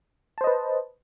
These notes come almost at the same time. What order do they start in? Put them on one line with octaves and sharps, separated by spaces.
A5 C5 D#5 B4